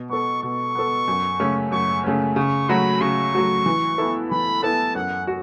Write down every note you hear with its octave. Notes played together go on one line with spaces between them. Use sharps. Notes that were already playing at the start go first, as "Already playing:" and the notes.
Already playing: B2
B3 A4 C#6
B2 C#6
B3 A4
F#2
C#3 A3 C#4
F#2 C#6
C#3 A3 C#4
C#3 C#6
F#3 A3 F#4 B5
C#3 C#6
F#3 A3 F#4
E3
B3 E4 A4
E3 B5
B3 E4 A4 A5
F#2 F#5
F#4